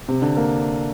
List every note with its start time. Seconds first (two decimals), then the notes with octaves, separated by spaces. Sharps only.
0.08 C3
0.22 D3
0.37 A#3